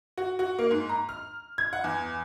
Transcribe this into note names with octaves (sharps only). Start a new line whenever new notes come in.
F#4
F#4
A#3
G#2
A#5
F6
G#6
F#5
E2